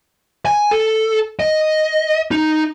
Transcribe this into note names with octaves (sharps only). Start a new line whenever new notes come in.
G#5
A4
D#5
D#4